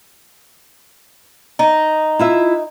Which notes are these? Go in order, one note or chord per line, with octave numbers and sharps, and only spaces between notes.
D#4
E4 F4 E5